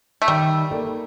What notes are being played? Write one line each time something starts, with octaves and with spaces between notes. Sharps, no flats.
A3
D#3 G3
A#3 D#4 A4 D5